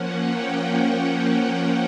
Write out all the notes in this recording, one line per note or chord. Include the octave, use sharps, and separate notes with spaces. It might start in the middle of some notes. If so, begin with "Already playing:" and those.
Already playing: F3 A#3 C#4 F#5
G5
G5